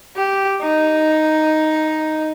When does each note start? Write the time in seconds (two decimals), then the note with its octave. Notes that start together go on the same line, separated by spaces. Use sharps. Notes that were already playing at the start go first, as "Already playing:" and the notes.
0.16 G4
0.62 D#4